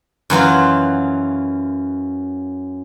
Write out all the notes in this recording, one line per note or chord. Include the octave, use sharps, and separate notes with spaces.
F#2 E3 F#3 F4